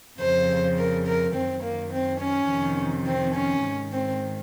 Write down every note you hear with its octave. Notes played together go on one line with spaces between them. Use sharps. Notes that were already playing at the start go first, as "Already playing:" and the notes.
F2 C#3 C5
A#4
A#4
F#2 D#3 C4
A#3
C4
C#4
F2 C3 D#3
C4
C#4
G#2 D#3
C4